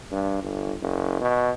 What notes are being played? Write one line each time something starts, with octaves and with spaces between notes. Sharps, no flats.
G2
G1
F#1
B2